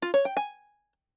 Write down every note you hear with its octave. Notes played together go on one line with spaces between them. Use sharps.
F4
C#5
G5
G#5